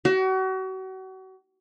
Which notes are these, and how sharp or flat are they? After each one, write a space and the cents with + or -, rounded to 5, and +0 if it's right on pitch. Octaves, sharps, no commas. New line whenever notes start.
F#4 +35